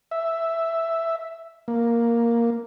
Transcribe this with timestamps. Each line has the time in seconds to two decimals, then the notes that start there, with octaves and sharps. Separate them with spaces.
0.11 E5
1.68 A#3